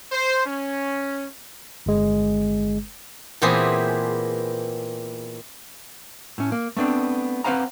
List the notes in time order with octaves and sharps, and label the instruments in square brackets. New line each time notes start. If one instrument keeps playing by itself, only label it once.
[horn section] C5
C#4
[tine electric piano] G1 G#3
[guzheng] A#2 E3 B3 C4 G4 G#4
[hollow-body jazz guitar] A2 C#4
A#3
A3 B3 C4 D4
C4 B4 C5 F5 F#5 A#5